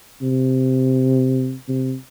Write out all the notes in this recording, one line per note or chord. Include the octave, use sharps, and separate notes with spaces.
C3
C3